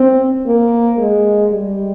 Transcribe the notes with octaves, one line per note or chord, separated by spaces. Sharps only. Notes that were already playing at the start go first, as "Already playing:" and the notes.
Already playing: C4
A#3
G#3
G3